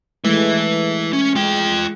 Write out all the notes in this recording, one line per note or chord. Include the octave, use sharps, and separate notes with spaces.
E3 G#3 A3 E4 B4
C#4
G#3 F4 G5